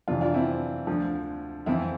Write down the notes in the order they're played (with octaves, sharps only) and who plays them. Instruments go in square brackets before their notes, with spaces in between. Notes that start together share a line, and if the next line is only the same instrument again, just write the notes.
[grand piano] F2 C3 E3 D4 F4
D4 F4
C4 E4
D2 D3 F3
F2 E3 C4 E4